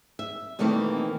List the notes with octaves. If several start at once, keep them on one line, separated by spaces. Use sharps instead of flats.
E5
B2 D#3 E3 A3 A#3 C4